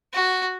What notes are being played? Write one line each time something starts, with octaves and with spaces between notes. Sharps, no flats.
F#4